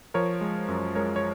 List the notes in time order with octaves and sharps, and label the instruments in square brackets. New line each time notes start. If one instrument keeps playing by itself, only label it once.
[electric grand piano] F3 A#4 C#5
G#3
F#2
G#3 A#4 C#5
C#5